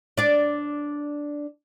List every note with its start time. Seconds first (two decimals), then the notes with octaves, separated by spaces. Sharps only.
0.17 D4 D5